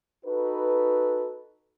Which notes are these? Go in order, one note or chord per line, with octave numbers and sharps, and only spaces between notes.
D#4 F#4 A4 B4